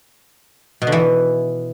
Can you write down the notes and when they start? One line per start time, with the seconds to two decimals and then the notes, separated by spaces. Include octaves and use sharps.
0.82 B2
0.87 D3
0.92 E3